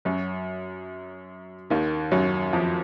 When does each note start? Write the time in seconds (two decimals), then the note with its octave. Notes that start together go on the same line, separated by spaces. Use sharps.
0.05 F#2 F#3
1.70 D#2 D#3
2.12 F#2 F#3
2.53 F2 F3